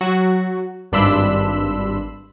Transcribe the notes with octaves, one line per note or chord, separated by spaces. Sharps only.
F#3 F#4
G#1 G2 D4 B5 C6 E6